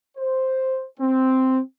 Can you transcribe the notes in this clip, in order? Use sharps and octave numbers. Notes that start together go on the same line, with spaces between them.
C5
C4